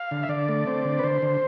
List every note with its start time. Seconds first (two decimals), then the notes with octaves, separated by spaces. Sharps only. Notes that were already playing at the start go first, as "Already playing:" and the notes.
Already playing: F5
0.11 D3
0.23 E5
0.29 D3 D5
0.48 A3
0.67 C4
0.85 D3
0.99 B4
1.04 D3 C5
1.22 D3